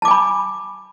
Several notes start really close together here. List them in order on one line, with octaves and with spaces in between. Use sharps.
A5 D6 G#5 B5